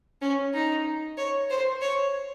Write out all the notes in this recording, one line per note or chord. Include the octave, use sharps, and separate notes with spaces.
C#4
D#4
C#5
C5
C#5